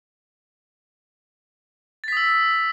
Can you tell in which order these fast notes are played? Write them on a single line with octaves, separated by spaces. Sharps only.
A6 B6 D#6 E6